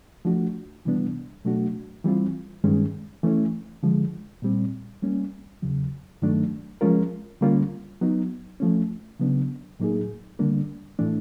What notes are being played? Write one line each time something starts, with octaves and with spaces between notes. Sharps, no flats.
F3 A3 D4 F#4
C3 E3 G3 B3 D4
B2 F#3 A3 D4 F#4
E3 G3 C4 F4
G2 D#3 G#3 C#4
E3 A3 C#4
D3 F3 G#3
A#2 G3 C4
G3 A#3 C#4
E2 C#3 F#3
G2 D#3 F#3 A3 D4
F3 G#3 C#4 F4 A#4
D3 G3 A#3 C#4 F4
F#3 B3 D#4
F3 A3 C#4
C#3 F#3 B3 D4
A2 F#3 A#3 D#4 G#4
D3 G3 A#3 D4
A2 E3 A3 D4